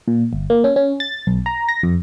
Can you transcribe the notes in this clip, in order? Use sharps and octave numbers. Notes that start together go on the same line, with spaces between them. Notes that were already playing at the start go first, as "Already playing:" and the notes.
A#2
G1
A#3
C#4
C#4
A6
B1
A#5
A#6
F2